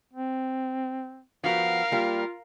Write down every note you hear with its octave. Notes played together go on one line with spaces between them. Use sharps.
C4
F3 B3 F#4 A#4 F5
G3 A#3 F4